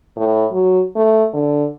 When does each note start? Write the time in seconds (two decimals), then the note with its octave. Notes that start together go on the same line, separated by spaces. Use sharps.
0.17 A2
0.52 F#3
0.96 A3
1.33 D3